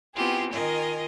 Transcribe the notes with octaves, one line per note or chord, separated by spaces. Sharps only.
B3 C4 E4 F4 G4 G#4
D#3 F4 A#4 D#5 G#5